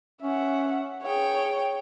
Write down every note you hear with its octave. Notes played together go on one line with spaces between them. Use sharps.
C#4 E5 F#5
G#4 C#5 G5